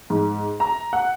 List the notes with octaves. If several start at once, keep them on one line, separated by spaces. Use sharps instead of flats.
G#2
A#5
F#5